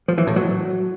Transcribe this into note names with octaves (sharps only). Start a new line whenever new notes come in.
F3
E3
A2
F#3